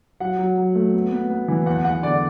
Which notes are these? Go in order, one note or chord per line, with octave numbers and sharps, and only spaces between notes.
F#3 F#5
F#3
F#3
A3
B3
B3
B3
E3
E2 F#5
E2 F#5
D3 D5